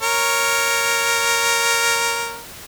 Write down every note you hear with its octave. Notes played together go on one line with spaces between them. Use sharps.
A#4 C#5